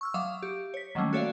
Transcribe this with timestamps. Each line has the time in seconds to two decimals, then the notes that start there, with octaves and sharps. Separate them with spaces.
0.01 C#6 E6 F6
0.14 F#3 E5 F5 D6 D#6
0.43 G4
0.74 C#5 B6
0.95 D#3 F#3 G3 A3 A#3 C#4
1.13 F#4 A4 C#5 D5 E5 F5